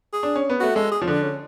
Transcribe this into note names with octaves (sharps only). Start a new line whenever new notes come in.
G#4
D4
C#4
B3
A3 F#4
G#3 A4
G#4
F3 C#4
D3 D4
C#4